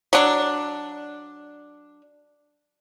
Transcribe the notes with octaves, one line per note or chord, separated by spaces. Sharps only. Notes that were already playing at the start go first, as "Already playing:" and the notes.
F#3 D4